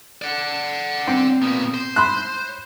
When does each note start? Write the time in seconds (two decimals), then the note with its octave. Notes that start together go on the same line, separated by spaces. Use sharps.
0.22 D5 F#5
1.07 C4
1.42 A#2 B3
1.74 C5
1.96 B5 C6 F#6